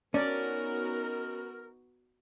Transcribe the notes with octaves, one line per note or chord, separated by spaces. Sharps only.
B3 C#4 D#4 F#4 A#4 D5